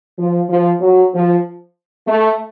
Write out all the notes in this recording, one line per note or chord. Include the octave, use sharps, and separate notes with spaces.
F3
F3
F#3
F3
A3